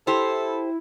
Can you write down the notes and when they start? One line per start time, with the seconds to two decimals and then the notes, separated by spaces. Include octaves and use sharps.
0.07 E4 G4 A4 C5